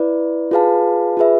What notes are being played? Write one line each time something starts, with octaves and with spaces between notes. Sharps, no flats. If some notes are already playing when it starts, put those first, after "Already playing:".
Already playing: E4 B4 D5
F4 G#4 B4 F5 A5
F4 G#4 B4 E5